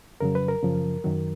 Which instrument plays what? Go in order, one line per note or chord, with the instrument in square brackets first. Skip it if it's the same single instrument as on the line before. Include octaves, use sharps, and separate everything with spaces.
[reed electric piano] F2 C#3 F#3 A#4
B4
A#4
F#2 C#3 F3
F#2 D#3 F#3